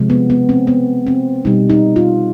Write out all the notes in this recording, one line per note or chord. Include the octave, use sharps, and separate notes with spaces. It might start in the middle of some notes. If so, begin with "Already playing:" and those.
Already playing: C3 F3 G#3
B3
B3
C4
B3
C4
B2 G3 D#4
D#4
F4